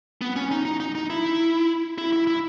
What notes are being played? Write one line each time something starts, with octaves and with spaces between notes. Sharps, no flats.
B3
C#4
D#4
D#4
D#4
D#4
E4
E4
E4
E4